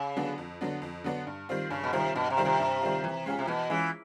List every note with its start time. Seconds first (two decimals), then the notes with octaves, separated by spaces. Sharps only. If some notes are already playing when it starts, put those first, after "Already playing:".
Already playing: C#3
0.17 D3 F#3 B3 D4
0.38 F2
0.61 D3 F#3 B3 D4
0.82 F2
1.04 D3 F#3 B3 D4
1.27 G2
1.49 D#3 G3 C4 F4
1.70 G2 C#3
1.84 B2
1.93 C3 D#3 G3 C4 F4
2.15 G2 B2
2.30 C3
2.37 D#3 G3 C4 F4
2.45 C3
2.60 G2
2.81 D#3 G3 C4 F4
3.04 E3
3.26 G#3 C#4 F4 G#4
3.39 C3
3.47 B2 E3
3.70 E3 G#3 C#4 F4 G#4